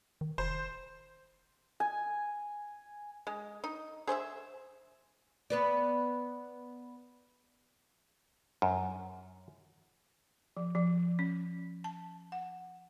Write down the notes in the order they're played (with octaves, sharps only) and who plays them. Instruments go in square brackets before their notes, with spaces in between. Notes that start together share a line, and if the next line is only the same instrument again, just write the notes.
[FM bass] D#3
[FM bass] F1 [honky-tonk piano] C5
[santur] G#5
[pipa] G#3
D#4
G#4 C5 D#5 E5
[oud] B3 B4 D5
[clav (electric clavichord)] F#2
[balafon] F3
F3
C#4
A5
F#5